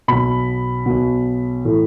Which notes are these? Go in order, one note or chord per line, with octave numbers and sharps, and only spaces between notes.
B1 B2 B5
B1 B2
A2 E3